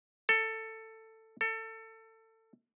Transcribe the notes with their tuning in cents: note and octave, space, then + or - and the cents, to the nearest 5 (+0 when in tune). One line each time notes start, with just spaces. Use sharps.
A4 +15
A4 +25